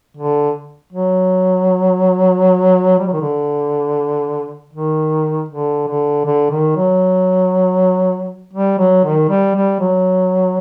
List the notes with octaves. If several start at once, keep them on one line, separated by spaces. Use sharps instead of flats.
D3
F#3
G3
F#3
D#3
D3
D#3
D3
D3
D3
D#3
F#3
G3
F#3
D#3
G3
G3
F#3